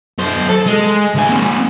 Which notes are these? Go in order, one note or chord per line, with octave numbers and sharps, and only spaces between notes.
F#2 C5
A4
G#3
D2 G#5
A#3 C4